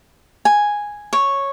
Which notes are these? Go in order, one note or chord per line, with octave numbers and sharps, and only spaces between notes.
G#5
C#5